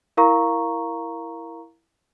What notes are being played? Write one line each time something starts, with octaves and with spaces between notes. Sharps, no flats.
E4 A#4 F5 A#5 C#6